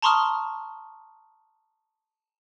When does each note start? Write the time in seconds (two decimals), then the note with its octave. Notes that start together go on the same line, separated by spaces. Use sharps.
0.02 A5 A#5 C6 C#6 D#6 F6